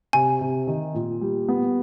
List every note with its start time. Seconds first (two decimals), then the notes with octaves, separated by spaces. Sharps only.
0.13 C3 G#5
0.41 C3
0.67 D#3
0.94 A#2
1.21 G3
1.48 B3